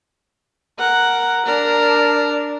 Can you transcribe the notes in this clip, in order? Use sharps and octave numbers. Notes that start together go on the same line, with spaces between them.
A#4 F#5
D4 A#4